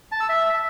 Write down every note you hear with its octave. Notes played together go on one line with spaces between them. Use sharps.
A5
E6
E5